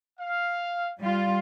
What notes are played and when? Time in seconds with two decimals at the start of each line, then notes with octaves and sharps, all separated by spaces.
0.20 F5
1.00 G3 F4